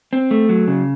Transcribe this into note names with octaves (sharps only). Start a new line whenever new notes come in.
C4
A3
F#3
C#3